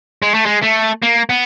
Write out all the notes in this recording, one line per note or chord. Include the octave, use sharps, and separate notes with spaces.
G#3
A3
G#3
A3
A#3
B3